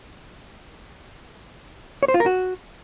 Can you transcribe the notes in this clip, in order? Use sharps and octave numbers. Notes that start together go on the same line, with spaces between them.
C#5
C5
F4
A#4
F#4